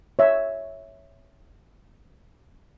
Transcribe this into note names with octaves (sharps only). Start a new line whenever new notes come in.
C#5 E5